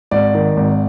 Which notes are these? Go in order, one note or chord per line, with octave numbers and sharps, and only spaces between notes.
G#1 D5
D#3
G#1